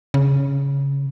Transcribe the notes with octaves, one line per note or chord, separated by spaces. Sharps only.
C#3